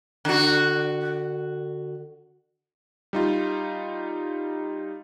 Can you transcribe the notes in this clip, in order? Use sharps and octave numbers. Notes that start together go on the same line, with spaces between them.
D3 F#4
G3 D#4 F4